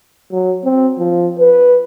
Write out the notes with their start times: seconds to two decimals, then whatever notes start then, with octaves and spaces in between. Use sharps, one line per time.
0.32 F#3
0.64 C4
0.99 F3
1.40 B4